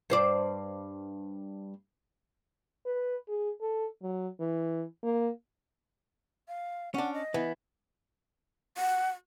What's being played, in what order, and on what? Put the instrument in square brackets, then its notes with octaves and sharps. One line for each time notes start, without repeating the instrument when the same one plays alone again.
[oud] G2 C5 D5
[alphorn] B4
G#4
A4
F#3
E3
A#3
[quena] F5
[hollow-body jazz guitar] C#4 D4 [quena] F#5
[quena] D#5
[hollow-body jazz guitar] E3 B3
[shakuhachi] F#5